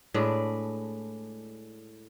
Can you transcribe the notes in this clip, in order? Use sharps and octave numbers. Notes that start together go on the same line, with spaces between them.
A2 G#3 D4 B4